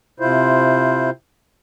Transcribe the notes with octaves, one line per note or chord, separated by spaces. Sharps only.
C3 E4 F4 C5